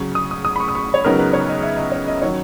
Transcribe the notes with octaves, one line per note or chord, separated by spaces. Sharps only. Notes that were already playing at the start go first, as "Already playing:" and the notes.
Already playing: C#3 F#3 C#4 C#6
D#6
D#6
D#6
B5
C#6
D#6
C#6
C#5
C#2 C#3 F#3 B3 D#4 A#4
B4
C#5
D#5
E5
D#5
C#5
D#5
D#3 F#3 C#4 C#5